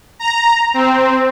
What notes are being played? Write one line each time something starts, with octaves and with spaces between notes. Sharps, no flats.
A#5
C4